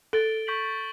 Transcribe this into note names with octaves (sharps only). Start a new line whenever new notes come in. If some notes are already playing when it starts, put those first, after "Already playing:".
A4 A6 D7 G7
C#6 G6 B6 D7 F#7